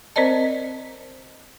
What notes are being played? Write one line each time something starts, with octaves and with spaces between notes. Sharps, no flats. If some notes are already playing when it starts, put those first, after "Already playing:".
C4 A#4 C5 D5 D#5 A5